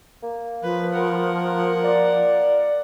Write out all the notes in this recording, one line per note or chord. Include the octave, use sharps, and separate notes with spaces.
A#3
F3 B4
A#4 F#5
D5